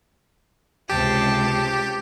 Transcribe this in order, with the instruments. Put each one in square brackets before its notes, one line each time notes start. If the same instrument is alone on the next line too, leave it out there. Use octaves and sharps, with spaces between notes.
[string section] C#2 C3 [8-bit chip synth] G4 [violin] A5